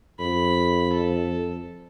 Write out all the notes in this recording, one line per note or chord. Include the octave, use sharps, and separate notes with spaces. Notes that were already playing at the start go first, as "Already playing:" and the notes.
F2 B5
A4